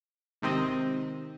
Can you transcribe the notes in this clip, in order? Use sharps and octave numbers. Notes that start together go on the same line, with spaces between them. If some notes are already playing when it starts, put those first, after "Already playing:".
G#1 C3 D#3 C4 D#5